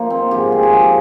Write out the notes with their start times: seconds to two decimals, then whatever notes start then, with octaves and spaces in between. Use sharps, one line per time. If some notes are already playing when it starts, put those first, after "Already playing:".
Already playing: F3 A#3 D#4
0.10 C4
0.31 G#2 F3 G4
0.52 G#4
0.63 G4
0.73 F3
0.82 G4